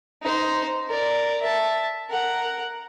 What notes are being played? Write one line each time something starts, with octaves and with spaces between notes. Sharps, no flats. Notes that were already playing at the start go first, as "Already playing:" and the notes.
D#4 C5
A#4 D5
E5 A5
A#4 F#5